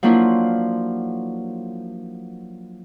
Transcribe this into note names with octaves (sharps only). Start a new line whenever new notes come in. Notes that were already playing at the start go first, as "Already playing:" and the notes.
F3 F#3 A#3 D4 E4 F4